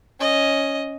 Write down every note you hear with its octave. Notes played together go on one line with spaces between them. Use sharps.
C#4 D#5